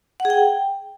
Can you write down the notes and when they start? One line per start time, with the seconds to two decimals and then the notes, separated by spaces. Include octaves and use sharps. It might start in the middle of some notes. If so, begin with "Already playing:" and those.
0.20 F#5
0.25 G#4
0.30 G5